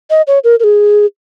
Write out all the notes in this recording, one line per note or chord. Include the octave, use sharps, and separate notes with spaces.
D#5
C#5
A#4
A#4
G#4